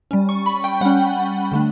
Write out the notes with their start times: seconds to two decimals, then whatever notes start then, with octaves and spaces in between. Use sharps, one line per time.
0.11 G3 C#4
0.29 C#6
0.46 B5
0.64 G5
0.81 G3 C#4 F#5
1.52 D3 A3 D4